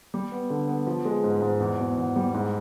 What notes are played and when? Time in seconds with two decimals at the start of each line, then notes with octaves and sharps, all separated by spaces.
0.14 G3
0.32 B3
0.50 D3
0.69 B3
0.87 F3
1.05 G#3
1.24 G#2
1.42 G#2
1.60 E2
1.79 B2
1.97 E2
2.16 G3
2.34 G#2